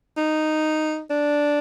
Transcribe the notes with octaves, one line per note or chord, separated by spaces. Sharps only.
D#4
D4